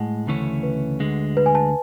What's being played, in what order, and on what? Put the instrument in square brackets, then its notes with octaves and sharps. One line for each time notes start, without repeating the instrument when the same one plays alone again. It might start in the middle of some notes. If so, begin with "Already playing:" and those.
Already playing: [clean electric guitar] A2 G#3 [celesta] F#5 G#5 A5
[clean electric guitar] D2 C#3 E3 A3 C#4
[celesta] B4
[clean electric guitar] D2 D3 G#3
[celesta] B4
G#5
A5